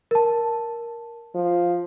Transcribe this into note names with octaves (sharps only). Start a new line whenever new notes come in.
A#4 A5
F3